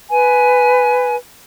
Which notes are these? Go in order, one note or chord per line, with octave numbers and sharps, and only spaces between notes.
B4 G#5